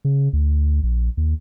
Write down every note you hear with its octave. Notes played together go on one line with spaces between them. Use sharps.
C#3
D2
A#1
D#2